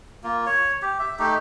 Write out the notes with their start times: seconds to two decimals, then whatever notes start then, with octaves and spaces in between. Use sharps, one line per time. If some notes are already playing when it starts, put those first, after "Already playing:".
0.24 A#3 F4
0.46 C#5
0.82 G4
0.99 E5
1.19 A3 D#4 G4